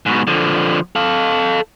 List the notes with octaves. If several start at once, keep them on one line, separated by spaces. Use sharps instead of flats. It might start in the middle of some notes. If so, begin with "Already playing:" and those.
G#2 B2
D3 F3
A4 F5